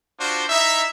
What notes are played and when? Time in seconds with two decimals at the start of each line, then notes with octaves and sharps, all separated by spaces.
0.19 D4 F4 F#4 C5
0.50 D#4 E4 E5